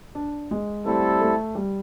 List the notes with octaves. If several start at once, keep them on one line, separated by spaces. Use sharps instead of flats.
D4
G#3
G3 A3 C4 E4 A4
A3
G3